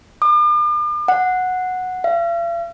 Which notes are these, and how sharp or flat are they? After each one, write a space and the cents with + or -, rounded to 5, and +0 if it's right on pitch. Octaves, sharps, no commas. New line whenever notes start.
D6 +45
F#5 -10
F5 -45